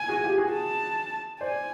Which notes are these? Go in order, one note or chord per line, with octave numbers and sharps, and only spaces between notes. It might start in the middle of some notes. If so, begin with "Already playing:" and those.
Already playing: G#5
F#4 G#4
F4 G4
F#4 G#4
A5
C5 D5 G#5